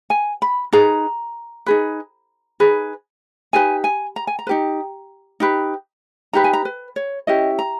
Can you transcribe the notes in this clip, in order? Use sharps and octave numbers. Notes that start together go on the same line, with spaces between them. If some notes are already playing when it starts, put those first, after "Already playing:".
G#5
B5
D#4 G#4 B4 A#5
D#4 G#4 B4
D#4 G#4 B4
D#4 G4 B4 G#5
G#5
A#5
G#5
A#5
B4
D#4 G4
D#4 G4 B4
D#4 G4 B4 A#5
G#5
A#5
B4
C#5
C#4 E4 G4 D#5
A#5